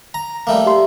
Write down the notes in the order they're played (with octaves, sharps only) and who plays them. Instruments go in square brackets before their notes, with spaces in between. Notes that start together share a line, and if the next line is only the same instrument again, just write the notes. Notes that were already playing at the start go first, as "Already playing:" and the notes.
[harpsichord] A#5
G3 A3 A#3
[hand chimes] G4 E5 C6